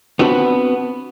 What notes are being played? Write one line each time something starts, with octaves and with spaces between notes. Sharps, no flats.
B3 C4 D4 F#4 B4